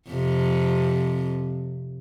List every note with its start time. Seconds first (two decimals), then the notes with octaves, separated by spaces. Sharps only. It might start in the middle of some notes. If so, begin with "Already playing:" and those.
0.11 F2 C3